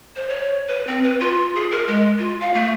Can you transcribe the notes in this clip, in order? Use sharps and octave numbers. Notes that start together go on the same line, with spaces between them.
C5
C#5
B4
C4
B4
F4
G#4
A#4
G#3
F4
F5
A3